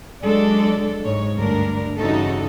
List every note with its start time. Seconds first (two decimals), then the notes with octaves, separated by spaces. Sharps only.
0.23 F#3 G#3 D4 A4 D5
1.05 G#2 C#5
1.37 D2 G2 D4 A#4
1.99 G2 C#3 E3 D#4 F#4 A4